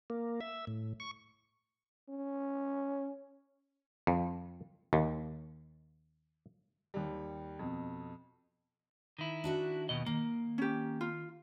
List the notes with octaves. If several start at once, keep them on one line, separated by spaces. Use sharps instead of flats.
A#3
E5
A2
C#6
C#4
F2
D#2
D#2 G3
F2 B2
D#3 E4
D4 F#4 E5
D#2 B2 D#5
D#3 A#3
C#4 G4
F4